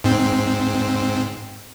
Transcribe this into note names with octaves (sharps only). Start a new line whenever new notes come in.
G#2 C4